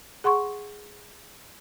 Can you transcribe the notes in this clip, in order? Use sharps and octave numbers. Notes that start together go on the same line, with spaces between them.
G#4 F#5 C6 C#6